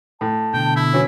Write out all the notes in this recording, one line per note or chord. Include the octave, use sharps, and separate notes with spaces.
A2 A5
B2 D3 G5
E4
E3 F#3 C#4 C#5